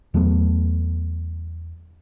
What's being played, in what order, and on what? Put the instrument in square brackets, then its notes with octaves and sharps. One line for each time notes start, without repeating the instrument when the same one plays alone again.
[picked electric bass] E2 F#3 A3 B3